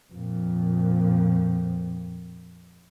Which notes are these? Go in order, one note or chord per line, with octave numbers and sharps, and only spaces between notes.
F2 A#2